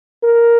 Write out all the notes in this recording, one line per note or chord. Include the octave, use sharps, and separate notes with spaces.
A#4